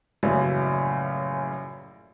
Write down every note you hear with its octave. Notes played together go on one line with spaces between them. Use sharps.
A#1 F#2 A2 C#3 E3 F#3